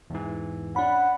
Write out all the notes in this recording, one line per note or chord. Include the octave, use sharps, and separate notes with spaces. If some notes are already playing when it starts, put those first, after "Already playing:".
E2 G#2 E3
C#4 D4 F#5 B5